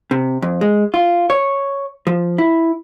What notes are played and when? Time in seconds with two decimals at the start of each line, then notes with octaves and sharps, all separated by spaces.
0.11 C3
0.42 F2
0.61 G#3
0.94 F4
1.30 C#5
2.07 F3
2.38 E4